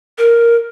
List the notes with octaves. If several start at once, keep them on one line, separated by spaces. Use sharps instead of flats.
A#4